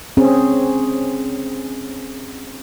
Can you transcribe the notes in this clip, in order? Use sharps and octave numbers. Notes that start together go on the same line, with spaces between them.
C4 C#4 G#4